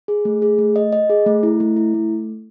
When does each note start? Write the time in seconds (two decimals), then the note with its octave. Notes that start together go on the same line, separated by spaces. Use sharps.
0.08 G#4
0.25 A3
0.42 G#4
0.59 A3
0.76 D#5
0.93 D#5
1.10 G#4
1.26 A3
1.43 E4
1.60 A3
1.77 E4
1.94 A3